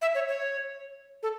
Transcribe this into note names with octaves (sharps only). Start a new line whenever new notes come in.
E5
C#5
C#5
A4